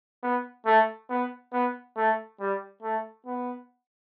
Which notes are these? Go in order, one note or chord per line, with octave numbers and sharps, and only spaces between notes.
B3
A3
B3
B3
A3
G3
A3
B3